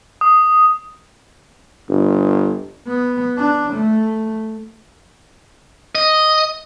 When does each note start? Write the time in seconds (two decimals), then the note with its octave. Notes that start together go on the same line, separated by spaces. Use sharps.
0.21 D#6
1.89 G1
2.88 B3
3.38 D4
3.74 A3
5.95 D#5